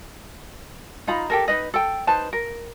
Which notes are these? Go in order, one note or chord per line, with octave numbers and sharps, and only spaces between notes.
D#4 F4 A#5 B5
G4 A4 A#4
D#4 B4 D#5
A4 G5
D#4 B4 C5 A5
A#4